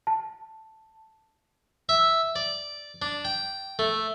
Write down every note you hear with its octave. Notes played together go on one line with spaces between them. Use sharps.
A5
E5
D5
D4
G5
A3